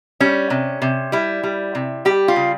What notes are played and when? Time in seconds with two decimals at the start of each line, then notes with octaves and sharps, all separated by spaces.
0.20 G3 C#4
0.50 C3
0.82 C3
1.12 G3 E4
1.43 G3
1.75 C3
2.05 G3 G4
2.28 F4
2.36 C#3